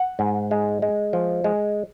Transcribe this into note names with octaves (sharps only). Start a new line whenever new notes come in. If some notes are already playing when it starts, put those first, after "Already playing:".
Already playing: F#5
G#2
G#3
G#3
F3
G#3